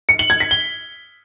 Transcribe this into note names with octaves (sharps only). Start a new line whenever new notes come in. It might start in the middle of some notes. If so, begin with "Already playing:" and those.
C#7
F#7
G#6
B6
G7